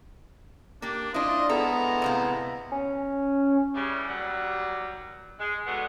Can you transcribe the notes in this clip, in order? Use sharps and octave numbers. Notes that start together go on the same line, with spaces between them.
A#3 D4 G4
D4 E4 F4 C5 D#5
E3 G#3 B3 E4 A4 A#5
A2 C3 F5
C#4
C#3 E3 G3
D#2 F#3 G3 D5 F#5
G#3
F#3 G#3 A3 B3 D4 F#4